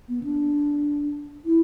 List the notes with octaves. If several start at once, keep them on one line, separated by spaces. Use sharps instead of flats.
B3
D4
E4